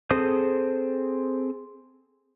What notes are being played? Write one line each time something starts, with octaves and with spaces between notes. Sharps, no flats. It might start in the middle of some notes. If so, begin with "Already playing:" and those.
C4 G#4 A4 C5 D#6